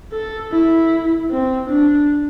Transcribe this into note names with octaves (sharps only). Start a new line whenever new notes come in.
A4
E4
C4
D4